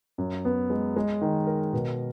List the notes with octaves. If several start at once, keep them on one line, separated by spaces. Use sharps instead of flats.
F#2
B3
G#3
G#3
D#3
A#4
B2